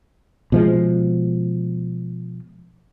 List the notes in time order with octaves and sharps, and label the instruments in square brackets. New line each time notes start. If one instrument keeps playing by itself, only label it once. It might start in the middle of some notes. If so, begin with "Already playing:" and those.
[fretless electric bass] B2 F3 G#3